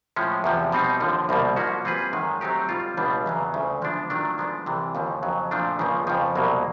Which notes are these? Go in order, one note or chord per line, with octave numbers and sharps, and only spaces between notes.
A2 F3 G#3 C#4
E2 C3 F3
B2 G3 C4 D#4
D#2 D3 F3
C2 B2 G3 A#3
F3 A#3 C#4 F#4
G3 C4 F4 G#4 B4
F#2 D#3 G#3
F#3 A3 C4 D#4 G4
G3 C4 F4
C#2 B2 G3 B3 D4
E2 C#3 F#3
D2 C#3 F3 A3 D4
F3 G#3 B3 D4
D#3 F#3 A3 D4 F4
F3 G#3 B3 D4
C2 C3 E3
D#2 C#3 F3
F2 C#3 F#3
A#2 F3 A3 D4
C#2 C#3 F3 A#3
F2 C#3 F3
C2 B2 F#3 A#3